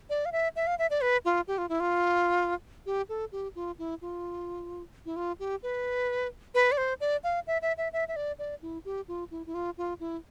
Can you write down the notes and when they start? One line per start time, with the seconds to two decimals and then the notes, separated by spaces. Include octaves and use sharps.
0.10 D5
0.26 F5
0.32 E5
0.56 E5
0.67 F5
0.79 E5
0.90 D5
1.01 B4
1.25 F4
1.48 G4
1.58 F4
1.69 E4
1.80 F4
2.86 G4
3.09 A4
3.32 G4
3.55 F4
3.79 E4
4.01 F4
5.06 E4
5.16 F4
5.40 G4
5.63 B4
6.55 B4
6.72 D5
6.78 C5
7.01 D5
7.24 F5
7.47 E5
7.62 E5
7.78 E5
7.93 E5
8.08 E5
8.16 D5
8.39 D5
8.62 E4
8.85 G4
9.08 F4
9.31 E4
9.46 E4
9.54 F4
9.78 F4
10.00 E4